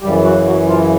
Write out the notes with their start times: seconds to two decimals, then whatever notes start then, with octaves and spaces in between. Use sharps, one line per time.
0.02 F#2 C#3 E3 G3 G4
0.24 F#3 F#4
0.45 F#3 F#4
0.68 F3 F4